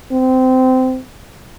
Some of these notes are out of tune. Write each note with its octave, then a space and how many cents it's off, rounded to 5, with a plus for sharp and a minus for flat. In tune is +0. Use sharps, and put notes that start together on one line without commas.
C4 -20